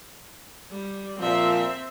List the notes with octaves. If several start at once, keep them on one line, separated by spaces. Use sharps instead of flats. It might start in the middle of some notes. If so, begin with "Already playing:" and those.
G3
A#2 F3 C4 E5